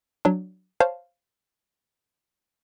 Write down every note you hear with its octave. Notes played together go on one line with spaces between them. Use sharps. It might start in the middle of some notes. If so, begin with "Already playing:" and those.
F#3 D4
C5 C#5 F5 A5